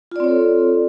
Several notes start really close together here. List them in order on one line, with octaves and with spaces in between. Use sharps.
F4 D5 C4 C#5 A4